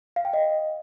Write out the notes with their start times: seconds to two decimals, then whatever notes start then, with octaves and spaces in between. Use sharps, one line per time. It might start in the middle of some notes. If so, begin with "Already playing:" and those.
0.16 F5
0.25 G5
0.33 D#5